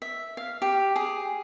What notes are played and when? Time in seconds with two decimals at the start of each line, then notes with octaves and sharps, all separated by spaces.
0.02 E5
0.37 F5
0.62 G4
0.96 G#4